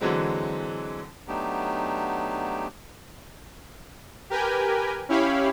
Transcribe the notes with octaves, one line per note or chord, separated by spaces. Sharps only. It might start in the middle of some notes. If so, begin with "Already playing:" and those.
D3 E3 F#3 G#3 C4
F#3 A3 B3 D4 D#4 G4
G4 A#4 B4 G5 G#5
C#4 E4 G4 C#5 F5 B5